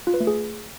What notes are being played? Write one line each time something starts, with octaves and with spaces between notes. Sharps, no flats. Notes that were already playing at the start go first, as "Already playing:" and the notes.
F4
B4
A3
G#4